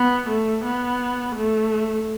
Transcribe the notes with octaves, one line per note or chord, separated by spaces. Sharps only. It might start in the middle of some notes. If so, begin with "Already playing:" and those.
Already playing: B3
A3
B3
A3